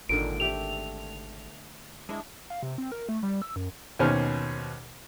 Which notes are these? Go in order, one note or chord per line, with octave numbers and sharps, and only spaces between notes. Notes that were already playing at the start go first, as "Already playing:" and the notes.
G#1 A#2 D3 D#3 D7
A3 G4 E5 F7
G#3 D4 E4
F5
C3
C4
A#4
A3
G3
E6
F#2
D#2 B2 C#4 C5 F6